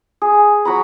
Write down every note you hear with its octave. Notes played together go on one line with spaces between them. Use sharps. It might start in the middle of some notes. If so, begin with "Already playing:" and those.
G#4
F#3 F#4 A#5 B5